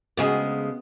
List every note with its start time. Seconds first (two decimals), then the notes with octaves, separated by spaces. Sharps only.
0.17 D2 C#3 G#3 B3 F#4 G#4